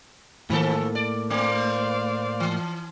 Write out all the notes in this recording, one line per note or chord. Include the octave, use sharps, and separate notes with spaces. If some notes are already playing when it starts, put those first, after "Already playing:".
A2 D#3 F3 A#3 A4
D5
A3 C5 D5 F5
E3